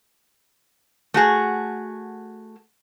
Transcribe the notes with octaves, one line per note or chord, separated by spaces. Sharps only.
A3 F#4 G#4